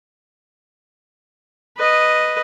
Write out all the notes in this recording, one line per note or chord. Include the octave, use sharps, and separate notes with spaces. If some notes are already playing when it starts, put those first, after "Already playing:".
B4 D#5